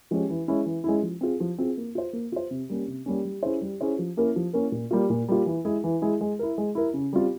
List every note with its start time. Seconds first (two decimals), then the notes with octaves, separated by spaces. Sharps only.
0.11 F3 G#3 C#4 G4
0.30 E3
0.48 G#3 C#4 E4
0.66 E3
0.84 G#3 C#4 E4
1.03 F3
1.21 C4 F4 G#4
1.40 F3
1.58 C4 F4 G#4
1.77 A#3
1.95 F4 C5
2.13 A#3
2.32 F4 C5
2.51 C3
2.69 G3 A#3 C#4
2.88 C3
3.06 G3 A#3 C#4
3.25 G3
3.43 C#4 E4 G#4 C5
3.61 G3
3.81 C#4 E4 G#4 C5
3.99 F3
4.17 A#3 C#4 E4 A#4
4.36 F3
4.53 A#3 C#4 E4 A#4
4.72 A#2
4.91 G3 A#3 F4
5.10 A#2
5.28 G3 A#3 F4
5.46 E3
5.65 G#3 E4 G#4
5.84 E3
6.02 G#3 E4 G#4
6.21 G#3
6.39 E4 A#4
6.58 G#3
6.75 E4 A#4
6.94 C#3
7.13 G3 C4 F4